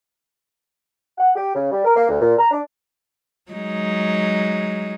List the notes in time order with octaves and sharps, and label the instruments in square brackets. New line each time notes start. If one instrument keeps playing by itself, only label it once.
[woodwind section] F#5
G4
C#3
G3
A#4
A#3
D2
A#2
A#5
D4
[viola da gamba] F#3 G#3 D#4